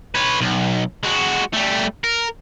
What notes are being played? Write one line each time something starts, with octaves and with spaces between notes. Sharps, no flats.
B4 C#5
B1
G#3 F#4
G3 A3
A#4